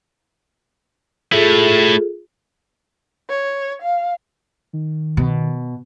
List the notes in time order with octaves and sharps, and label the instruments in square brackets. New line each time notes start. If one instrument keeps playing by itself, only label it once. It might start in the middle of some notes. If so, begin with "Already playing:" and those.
[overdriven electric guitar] A3 E4 [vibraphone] F4 G#4 A4
[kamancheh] C#5
F5
[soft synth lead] D#3
[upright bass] B2